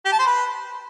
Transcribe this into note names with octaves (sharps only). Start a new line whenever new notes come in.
G4
A5
C5
B4